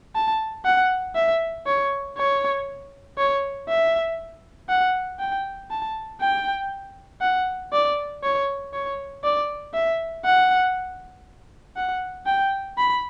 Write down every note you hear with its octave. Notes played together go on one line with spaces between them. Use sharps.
A5
F#5
E5
C#5
C#5
C#5
E5
F#5
G5
A5
G5
F#5
D5
C#5
C#5
D5
E5
F#5
F#5
G5
B5